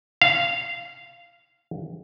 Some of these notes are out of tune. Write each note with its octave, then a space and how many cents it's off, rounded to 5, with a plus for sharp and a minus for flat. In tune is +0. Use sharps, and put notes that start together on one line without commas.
F5 -15